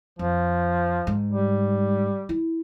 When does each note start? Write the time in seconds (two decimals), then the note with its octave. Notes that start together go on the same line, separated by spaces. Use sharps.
0.19 F2 F3
1.07 G#2
1.31 G3
2.29 E4